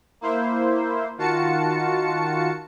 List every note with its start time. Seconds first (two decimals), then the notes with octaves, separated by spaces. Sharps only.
0.21 A#3 E4 C5
1.18 D#3 F4 F#4 A5 C#7